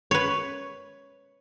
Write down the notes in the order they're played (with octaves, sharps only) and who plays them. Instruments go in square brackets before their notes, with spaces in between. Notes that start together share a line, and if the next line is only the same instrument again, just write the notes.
[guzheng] B4 C#5